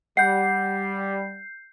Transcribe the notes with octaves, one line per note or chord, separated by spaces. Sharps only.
G3 F#5 G6 C7